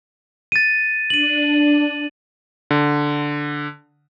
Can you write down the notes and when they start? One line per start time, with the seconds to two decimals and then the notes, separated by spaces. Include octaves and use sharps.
0.52 A6 D#7
1.10 D4 D#7 F#7
2.71 D3